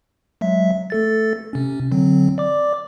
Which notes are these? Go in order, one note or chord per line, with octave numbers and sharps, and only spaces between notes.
F#3 G#3 E5
A3 A4 A6
C3 C#4
D3 F#3 C4
D5 D6